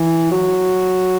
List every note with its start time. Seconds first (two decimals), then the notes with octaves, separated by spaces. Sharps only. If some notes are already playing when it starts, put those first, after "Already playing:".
Already playing: E3
0.31 F#3